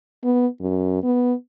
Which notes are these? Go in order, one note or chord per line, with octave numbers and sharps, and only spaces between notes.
B3
F#2
B3